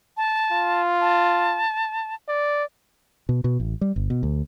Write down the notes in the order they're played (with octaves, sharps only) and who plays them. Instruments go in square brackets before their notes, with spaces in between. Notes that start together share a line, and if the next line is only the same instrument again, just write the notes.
[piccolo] A5
[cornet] F4
[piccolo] A5
[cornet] D5
[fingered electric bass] B2
B2
A1
G3
G1
B2
D2